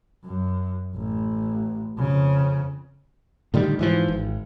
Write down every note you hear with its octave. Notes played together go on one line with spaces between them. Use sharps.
F#2
A1
F2 C#3
A2 D3 D#3 G3
G#2 E3 F3
G#1